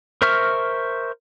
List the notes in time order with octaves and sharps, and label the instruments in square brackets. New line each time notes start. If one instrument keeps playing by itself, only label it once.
[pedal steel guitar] A#4 C5 E5 C#6 F6